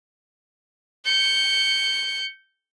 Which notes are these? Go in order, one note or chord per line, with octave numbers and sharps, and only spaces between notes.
G6 C#7